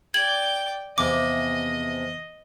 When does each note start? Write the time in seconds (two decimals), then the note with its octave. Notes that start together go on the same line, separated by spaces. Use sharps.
0.14 D5 G5 G#6 F#7
0.98 E2 C3 F3 D#5 D6